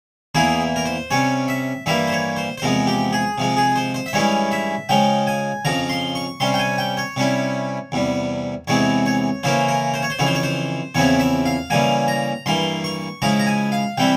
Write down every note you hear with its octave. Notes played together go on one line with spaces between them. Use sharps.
E2 E3 A#3 E4 G#4
A#4
C5
C3 G3 C#4 C#5
E5
G2 E3 G3 A#3 E4 E5
C5
C#5
C5
C5
E2 C3 F3 G#3 A#4
G4
G#4
C3 F3 G#3
G#4
C5
C5
E5
G2 E3 G#3 C#4 E4 C#5
E5
C#3 F3 G#3 G5
G#5
F2 C#3 F3 A#5
C6
C#6
C3 G3 C#4 C6
G5
G#5
G5
C#5
C3 G3 C#4 E4
E2 C3 G3
E2 C3 E3 G#3 C4 C#5
C#5
C#3 E3 A#3 C#4 E4 C5
A#4
C5
C#5
C5
F2 C#3 E3 C#5
C5
C#5
C5
E2 C#3 F3 C4 E4 C#5
E5
F5
C#3 E3 G3 A#3 G#5
A#5
G2 E3 A#3 C6
C#6
C#3 F3 G#3 E4 A#5
A#5
G#5
F5
C3 E3 G3 C4 E4 G5